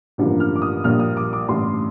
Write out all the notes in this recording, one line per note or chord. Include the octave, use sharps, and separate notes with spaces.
A1 G2 D3 F3 A#3
F6
D6
D#6
A#1 A#2 G3 A#3 F6
D#6
D6
D6
A1 G2 D3 A3 C6